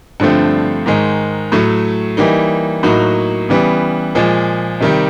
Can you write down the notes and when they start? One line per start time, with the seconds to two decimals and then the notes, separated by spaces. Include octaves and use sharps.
0.20 G2 D3 F3 A3 C4
0.86 G#2 D#3 G#3
1.52 A2 F#3 A3
2.17 E3 G3 A#3 D#4
2.83 A2 F#3 A#3 D#4 F#4
3.49 C#3 E3 G3 B3
4.15 A#2 F3 G#3
4.81 C3 D#3 G3